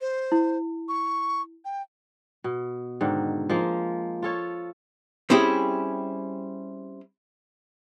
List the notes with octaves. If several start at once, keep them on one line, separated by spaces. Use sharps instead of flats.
C5
E4
C#6
G5
B2
G#2 D3 D#3
F3 G#3 A#3
F4 A4 C#5
G3 C4 C#4 E4 G4 G#4